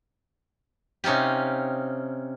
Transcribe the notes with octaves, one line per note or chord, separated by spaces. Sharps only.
C3 C#4 D#4 F4 G4